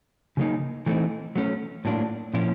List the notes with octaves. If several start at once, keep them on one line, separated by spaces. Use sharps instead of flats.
C#3 F#3 A#3 D#4
E3 A3 C4 D#4
F#3 A3 C#4
A2 F#3 A#3 D4 F4
A#2 F3 A#3 C#4 E4